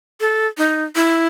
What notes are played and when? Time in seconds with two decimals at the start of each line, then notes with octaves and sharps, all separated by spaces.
0.20 A4
0.58 D#4
0.95 E4